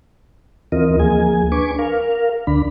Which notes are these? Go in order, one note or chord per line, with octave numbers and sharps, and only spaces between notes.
D#2 E3 C4 F4 A#4 D#5
D2 F3 A#3 G#4 G#5
D4 B4 G#5 C#6 D6
A#4 F5
D2 D3 D4 B5